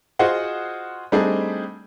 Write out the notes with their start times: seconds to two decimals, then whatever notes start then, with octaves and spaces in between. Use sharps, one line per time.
0.19 F4 F#4 G#4 C5 D#5 F#5
1.12 G3 A3 C4 D4 D#4 G#4